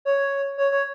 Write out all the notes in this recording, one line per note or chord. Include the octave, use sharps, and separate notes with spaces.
C#5
C#5
C#5